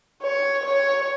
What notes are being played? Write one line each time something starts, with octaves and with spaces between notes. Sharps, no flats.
C#5
C#5